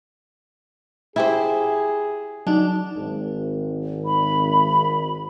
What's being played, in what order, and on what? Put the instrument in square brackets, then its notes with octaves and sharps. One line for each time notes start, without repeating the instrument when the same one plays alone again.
[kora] E4 G4 C5 [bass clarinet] G#4
[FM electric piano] F#3 D#4 [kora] D4
[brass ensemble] G#1
[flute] B5